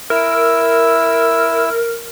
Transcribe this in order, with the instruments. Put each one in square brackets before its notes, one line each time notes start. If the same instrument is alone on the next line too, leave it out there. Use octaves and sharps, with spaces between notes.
[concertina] E4 E6 [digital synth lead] A#4